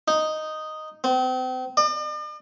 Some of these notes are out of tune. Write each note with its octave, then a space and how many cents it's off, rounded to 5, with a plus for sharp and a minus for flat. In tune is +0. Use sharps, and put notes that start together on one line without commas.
D#4 +0
C4 -35
D5 +45